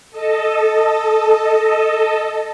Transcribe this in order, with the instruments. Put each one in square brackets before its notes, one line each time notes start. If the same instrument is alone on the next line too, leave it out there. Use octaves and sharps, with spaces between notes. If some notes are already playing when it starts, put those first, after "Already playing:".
[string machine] A4 D#5 A5